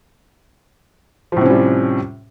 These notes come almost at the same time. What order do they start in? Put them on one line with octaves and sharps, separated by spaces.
F3 A2 C3 C#4 G3